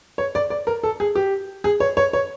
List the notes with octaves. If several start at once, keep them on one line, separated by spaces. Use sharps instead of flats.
C#5
D5
D5
A#4
A4
G#4
G4
G#4
C#5
C#5
C#5